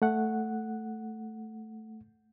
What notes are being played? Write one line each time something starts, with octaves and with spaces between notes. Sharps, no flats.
A3 F#5